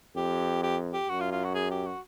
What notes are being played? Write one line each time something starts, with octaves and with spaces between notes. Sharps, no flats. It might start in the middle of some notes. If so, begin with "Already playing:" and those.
F2 G4
G4
G4
F#2 F#4
F4
F4
F#4
G#4
G4
F#4